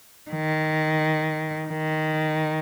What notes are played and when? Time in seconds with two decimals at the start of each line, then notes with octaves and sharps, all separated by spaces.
0.31 D#3
1.69 D#3